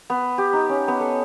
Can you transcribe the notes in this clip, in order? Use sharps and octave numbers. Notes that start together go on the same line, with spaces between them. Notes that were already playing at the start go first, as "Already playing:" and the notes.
B3
G4
D#4
C#4
B3
A4